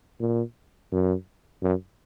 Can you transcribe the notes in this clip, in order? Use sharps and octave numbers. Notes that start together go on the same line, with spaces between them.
A#2
F#2
F#2